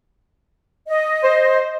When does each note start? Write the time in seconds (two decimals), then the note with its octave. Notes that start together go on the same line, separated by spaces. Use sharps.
0.87 D#5
1.23 C5